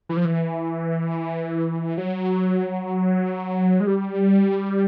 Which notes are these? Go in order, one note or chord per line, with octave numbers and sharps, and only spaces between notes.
E3
F3
E3
F#3
G#3
G3